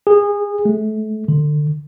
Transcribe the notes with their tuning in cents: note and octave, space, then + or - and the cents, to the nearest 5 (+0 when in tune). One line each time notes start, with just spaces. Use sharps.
G#4 -25
A3 -30
D3 +25